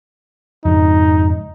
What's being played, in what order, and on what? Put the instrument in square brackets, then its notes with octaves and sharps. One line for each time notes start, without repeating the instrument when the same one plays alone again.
[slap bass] F2 G#2 C#3 [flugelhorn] D#4